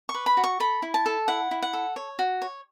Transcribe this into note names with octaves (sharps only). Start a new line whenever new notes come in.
C#6
B4
B5
F#4
C#6
A4 B5
E4
A5
A4
E4 F#5
E4
F#5
A4
C#5
F#4
C#5